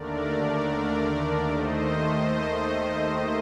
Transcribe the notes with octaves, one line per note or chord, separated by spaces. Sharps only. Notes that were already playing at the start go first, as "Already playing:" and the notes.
Already playing: D#2 D3 A3 D4 A#4 D5
D#2 D#3 A3 C5 D#5